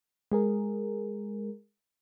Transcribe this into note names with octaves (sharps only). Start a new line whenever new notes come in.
G#3 G#4 A#4